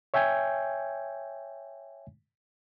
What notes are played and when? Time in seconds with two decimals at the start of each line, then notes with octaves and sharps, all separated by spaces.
0.14 C#5 E5 G5 G#5 G6 G#6